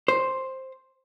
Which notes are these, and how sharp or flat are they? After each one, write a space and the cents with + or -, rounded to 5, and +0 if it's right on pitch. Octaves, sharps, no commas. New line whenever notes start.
C5 +5